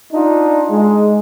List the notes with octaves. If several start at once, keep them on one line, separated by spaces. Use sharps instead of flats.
D4 D#4 F4
G#3